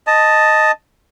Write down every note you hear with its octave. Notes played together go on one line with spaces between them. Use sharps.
D#5 A5